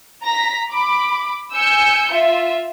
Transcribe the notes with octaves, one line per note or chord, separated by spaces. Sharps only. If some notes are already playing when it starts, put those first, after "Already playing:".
A#5 A#6 B6
B5 D6
G#5 E6 G6 C#7
F4 E5